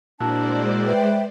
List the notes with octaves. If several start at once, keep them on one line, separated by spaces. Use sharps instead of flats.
A#2 G#3 D4 E4 F#4 C5 D5 A5
B4 E5 G5